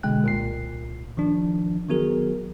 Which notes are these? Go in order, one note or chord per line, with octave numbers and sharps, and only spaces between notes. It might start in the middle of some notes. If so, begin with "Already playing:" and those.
B2 D3 G#3 G5 F#6
C2 A#2 C7
D#3 F3 D4
D#3 F#3 B3 F#4 G#4 A#4